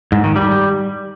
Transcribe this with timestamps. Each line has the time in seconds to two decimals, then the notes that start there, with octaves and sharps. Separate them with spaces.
0.12 G#2
0.24 D#3
0.36 G3